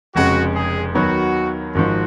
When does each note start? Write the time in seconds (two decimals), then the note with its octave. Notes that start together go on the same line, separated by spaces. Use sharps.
0.15 F1 F2 C#3 G#3 F#4
0.55 G#4
0.95 D#2 D#3 F#3 B3 F#4
1.74 G#1 G#2 F3 F#4